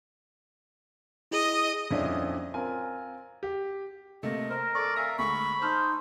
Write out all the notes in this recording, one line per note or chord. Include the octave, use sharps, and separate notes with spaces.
E4 G#4 D#5
F2 A#2 C#4 D4 E4 D#5
C4 F4 A#4 G#5
G4
C3 A3 A#3 D#5
A#4 C5
A4 D5 C#6
E5 F5 G#5 A#5
D2 G#3 A3 B5 C#6
D#4 C5 A5 E6 F6